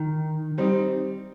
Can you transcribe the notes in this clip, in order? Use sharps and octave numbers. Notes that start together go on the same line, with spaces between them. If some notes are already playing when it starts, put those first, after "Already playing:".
Already playing: D#3
G3 C4 D#4